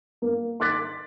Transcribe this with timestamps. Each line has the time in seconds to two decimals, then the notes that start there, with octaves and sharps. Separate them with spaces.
0.22 A#3
0.60 C6 D6 F#6 A6 B6